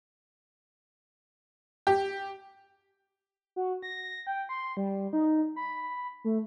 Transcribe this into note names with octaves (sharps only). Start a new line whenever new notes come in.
G4
F#4
A#6
G5
C6
G3
D#4
B5
A3